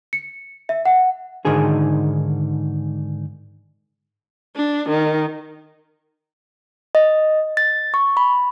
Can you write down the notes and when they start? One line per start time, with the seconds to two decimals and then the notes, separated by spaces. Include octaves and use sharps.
0.13 C#7
0.69 E5
0.85 F#5
1.45 G#2 D3 D#3 G#4
4.56 D4
4.89 D#3
6.95 D#5
7.57 A6
7.94 C#6
8.17 B5